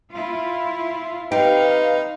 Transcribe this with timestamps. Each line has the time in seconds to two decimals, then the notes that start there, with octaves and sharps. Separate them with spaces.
0.11 E4 F4
1.32 C4 D#4 G4 B4 F5